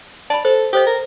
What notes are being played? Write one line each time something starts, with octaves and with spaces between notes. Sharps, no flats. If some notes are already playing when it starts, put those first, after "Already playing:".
D5 A5 B5
A4 C5
G4 A4 C5 D#5
A#4